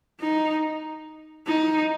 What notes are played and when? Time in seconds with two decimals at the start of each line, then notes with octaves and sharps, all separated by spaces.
0.20 D#4
1.47 D#4